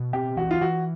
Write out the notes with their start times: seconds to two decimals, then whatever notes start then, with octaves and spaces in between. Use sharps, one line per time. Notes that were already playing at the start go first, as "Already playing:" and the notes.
Already playing: B2
0.13 C4 G4
0.37 E3 F#4
0.51 F4
0.61 E3 F#4